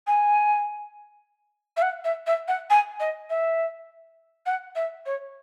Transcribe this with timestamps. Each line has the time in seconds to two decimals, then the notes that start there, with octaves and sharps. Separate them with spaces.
0.07 G#5
1.77 E5
1.82 F#5
2.04 E5
2.27 E5
2.48 F#5
2.70 G#5
3.00 D#5
3.30 E5
4.46 F#5
4.75 E5
5.06 C#5